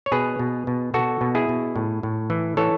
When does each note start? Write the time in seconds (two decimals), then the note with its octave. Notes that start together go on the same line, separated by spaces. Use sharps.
0.06 C#5
0.12 B2 G#4 B4
0.39 B2
0.67 B2
0.94 B2 F#4 A4
1.21 B2
1.35 E4 G#4
1.49 B2
1.76 A2
2.03 A2
2.30 E3
2.57 E3 A4 C#5